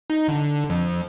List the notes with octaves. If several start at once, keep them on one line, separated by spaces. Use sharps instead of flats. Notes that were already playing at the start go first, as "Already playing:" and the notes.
D#4
D3
F2